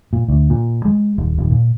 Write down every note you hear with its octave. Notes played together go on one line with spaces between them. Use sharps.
A#2
D2
A#2
G#3
D#1
D#1
A#2